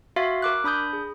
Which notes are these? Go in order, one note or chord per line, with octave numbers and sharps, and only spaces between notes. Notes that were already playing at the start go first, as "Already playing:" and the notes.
F#4 E5 F5 C6 A6 C7
A#4 D6 F#6
D4 B5 D#6 G6
G#4